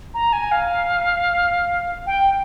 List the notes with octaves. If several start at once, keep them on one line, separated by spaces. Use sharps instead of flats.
A#5
G#5
F5
G5